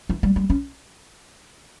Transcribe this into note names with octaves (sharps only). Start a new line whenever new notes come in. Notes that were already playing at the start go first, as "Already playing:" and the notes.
E3
G3
G3
C#4